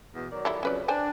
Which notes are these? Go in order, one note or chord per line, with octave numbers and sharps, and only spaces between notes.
E2 B2
D#3 F#3 D5
G3 E4 A4
F2 C#3 F#3 C#4 B4 D5
D4 C5 G5 G#5